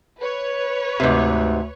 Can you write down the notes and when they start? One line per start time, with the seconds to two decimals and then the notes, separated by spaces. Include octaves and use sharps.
0.18 B4 C#5
1.00 D2 G#2 C3